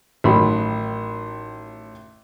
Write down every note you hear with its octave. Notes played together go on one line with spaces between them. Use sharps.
A1 D#3 F#3 B5